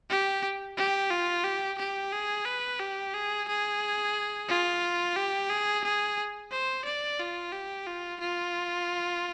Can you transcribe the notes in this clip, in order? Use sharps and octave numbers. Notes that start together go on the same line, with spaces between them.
G4
G4
F4
G4
G4
G#4
B4
G4
G#4
G#4
F4
G4
G#4
G#4
C5
D5
F4
G4
F4
F4